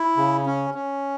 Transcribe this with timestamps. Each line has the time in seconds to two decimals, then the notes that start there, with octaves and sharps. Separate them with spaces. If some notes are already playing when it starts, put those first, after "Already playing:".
Already playing: E4
0.17 C#3
0.46 C#4
0.74 C#4